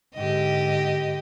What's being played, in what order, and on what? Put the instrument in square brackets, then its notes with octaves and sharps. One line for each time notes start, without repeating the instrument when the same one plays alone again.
[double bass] G#2 D3 [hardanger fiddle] G4 D#5